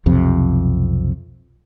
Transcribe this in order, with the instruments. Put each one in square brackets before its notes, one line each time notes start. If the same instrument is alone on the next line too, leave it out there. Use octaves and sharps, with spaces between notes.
[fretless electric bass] B1 F2 C3